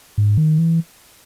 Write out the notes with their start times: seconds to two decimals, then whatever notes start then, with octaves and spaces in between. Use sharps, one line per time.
0.18 G#2
0.37 D#3
0.59 E3